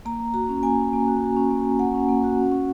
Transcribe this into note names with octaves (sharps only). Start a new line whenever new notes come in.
A#3 A#5
A#3
F#4 A#5
C#4
A#3 G#5
C#4
A#3
F#4
F#4
C#4
A#3
A#3
A#3 F#5
C#4
A#3
F#4
C#4
C#4